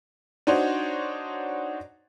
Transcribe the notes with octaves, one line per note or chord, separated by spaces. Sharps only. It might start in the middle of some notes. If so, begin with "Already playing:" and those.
D4 D#4 F#4 C5 C#5